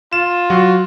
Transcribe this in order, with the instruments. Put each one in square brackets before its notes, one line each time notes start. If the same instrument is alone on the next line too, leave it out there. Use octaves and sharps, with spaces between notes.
[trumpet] F4 [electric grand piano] E7
[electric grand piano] F#3 F#4